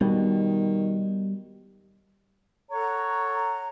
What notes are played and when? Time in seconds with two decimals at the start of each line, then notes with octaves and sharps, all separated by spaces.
0.01 B2 D#3 G3
2.72 A4 C#5 F#5 A#5